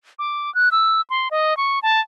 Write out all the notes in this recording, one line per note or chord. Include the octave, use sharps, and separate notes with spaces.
D6
F#6
E6
C6
D#5
C#6
A5